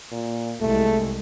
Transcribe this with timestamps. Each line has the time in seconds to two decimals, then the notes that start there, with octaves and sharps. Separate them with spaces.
0.12 A#2
0.61 C2 G#3 A3